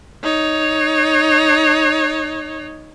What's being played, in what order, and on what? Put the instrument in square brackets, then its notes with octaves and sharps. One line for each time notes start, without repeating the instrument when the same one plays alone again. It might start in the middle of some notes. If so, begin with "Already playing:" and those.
[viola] D#4 C#5